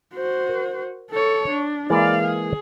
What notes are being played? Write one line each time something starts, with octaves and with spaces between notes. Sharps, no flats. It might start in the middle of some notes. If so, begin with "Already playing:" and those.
F#4 C5
A#4
A4 C#5
D4
E3 G#3 A#3 D5 F5
G#4